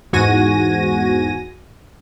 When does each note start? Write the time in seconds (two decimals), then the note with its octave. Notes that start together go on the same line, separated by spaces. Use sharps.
0.13 E2 G#2 F#4 G#5 A#6 D#7